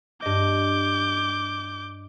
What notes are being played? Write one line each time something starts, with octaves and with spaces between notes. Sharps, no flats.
G2 D#5 D6 G6